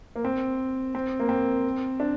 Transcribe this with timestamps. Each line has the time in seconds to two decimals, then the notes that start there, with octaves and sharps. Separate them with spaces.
0.16 A#3
0.25 C4
0.95 C4
1.20 A#3
1.29 C4
2.00 D4